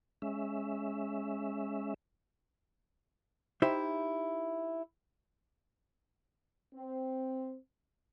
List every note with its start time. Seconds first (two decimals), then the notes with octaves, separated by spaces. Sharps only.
0.22 G#3 C#4 E5
3.62 D#4 E4 G4 C5 E5
6.74 C4